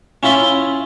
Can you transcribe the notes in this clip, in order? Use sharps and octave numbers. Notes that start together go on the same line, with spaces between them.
C#4 E4 F4 B5 C6